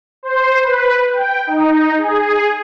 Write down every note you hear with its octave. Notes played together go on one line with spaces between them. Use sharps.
C5
B4
G5
D#4
G#4